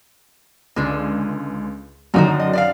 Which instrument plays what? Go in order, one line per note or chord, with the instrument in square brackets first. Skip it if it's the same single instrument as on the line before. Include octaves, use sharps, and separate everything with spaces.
[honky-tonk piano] C#2 [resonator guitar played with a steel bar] D3 G#3
[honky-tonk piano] F#2 D3 D#3 [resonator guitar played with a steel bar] F#3 D#4 F#4
[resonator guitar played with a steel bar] D#5
D5 D#5 F5